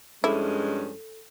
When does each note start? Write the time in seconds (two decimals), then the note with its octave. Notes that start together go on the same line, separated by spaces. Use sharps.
0.24 G2 F3 G#3 C#4 E4 A4